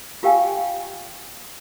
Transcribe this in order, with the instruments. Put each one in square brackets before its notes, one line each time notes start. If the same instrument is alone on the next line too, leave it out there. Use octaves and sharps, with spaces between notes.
[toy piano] F4 G4 F5 G5 G#5